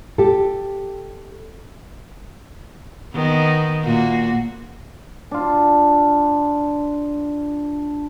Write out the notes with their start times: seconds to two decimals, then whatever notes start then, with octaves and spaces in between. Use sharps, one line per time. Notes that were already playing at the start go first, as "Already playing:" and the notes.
0.18 G4 A4
3.14 D#3 B3
3.84 A#2 A#3 F#4
5.31 D4 F4